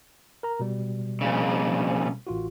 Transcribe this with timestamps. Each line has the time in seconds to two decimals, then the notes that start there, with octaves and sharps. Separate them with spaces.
0.43 A#4 A#5
0.60 B2 G3
1.21 F2 A#2 C#3
2.27 A1 F4 F#4